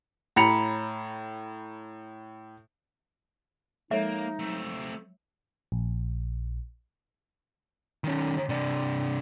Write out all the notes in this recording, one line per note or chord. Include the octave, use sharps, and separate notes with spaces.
A2 A#5 B5 C#7 F7
F3 G#3 A#3 D#4 A4 C#5 E5
F#3 A3 C4
A#1
D#3 C#4
C3 D4